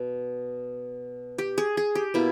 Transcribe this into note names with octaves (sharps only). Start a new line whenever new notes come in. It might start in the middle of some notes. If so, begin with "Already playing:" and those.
Already playing: B2
G4
G#4
G#4
G4
B2 A#3 E4